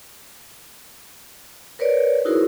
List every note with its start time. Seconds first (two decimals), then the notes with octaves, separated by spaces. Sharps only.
1.79 A#4 B4 C#5 D5
2.25 D#4 E4 F#4 G#4 A#4 C5